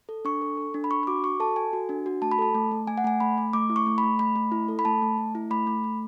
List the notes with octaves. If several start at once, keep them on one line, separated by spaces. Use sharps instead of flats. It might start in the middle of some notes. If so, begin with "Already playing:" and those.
A4
D4 C#6
A4
A4
D4
B5
D4 C#6
C#6
F#4 D6
F#4 C#6
A4 A5
A4 G#5
F#4
D4
F#4
A3 A5
B5
A4 A5
A3
A3
A3 G#5
F#5
A3 G#5
A3 B5
A3
A3 D6
E4
C#6
A3
B5
A3
A3 B5
A3
E4
A4
B5
A3 A5
A3
A3
E4
A3 B5
A3
A3